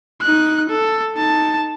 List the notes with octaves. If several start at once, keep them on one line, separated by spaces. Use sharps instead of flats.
D#4 F#6
A4
D#4 A5